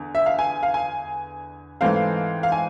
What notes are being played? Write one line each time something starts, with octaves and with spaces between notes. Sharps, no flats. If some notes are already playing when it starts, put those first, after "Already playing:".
Already playing: E2 D3
E5
F5
G#5
F5
G#5
G#2 E3 A3 C4 F5
F5
G#5